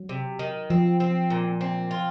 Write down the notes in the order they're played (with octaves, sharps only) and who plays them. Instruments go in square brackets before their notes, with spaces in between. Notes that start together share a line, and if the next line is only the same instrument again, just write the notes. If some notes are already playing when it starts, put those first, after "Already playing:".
Already playing: [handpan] F#3
[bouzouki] C3
D#3
[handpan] F3 [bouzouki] C4
[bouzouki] C4
A#2
C4
F4